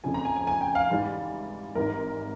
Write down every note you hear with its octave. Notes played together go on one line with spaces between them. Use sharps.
F1 F2 C#3 F3 G#5
A#5
G#5
G#5
G#5
G5
F5
G#2 E3 G3
G#1 G#2 E3 G3 A#4